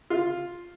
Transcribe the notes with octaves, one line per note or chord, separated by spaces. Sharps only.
F4